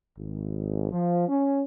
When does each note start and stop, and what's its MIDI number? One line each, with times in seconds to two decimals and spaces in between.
0.18 0.90 32
0.92 1.25 53
1.29 1.61 61